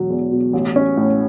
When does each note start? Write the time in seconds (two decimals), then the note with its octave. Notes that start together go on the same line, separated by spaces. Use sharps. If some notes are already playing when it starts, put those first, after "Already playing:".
Already playing: E1 F#3
0.10 E2
0.32 B2
0.53 A1
0.76 C#4
0.97 A2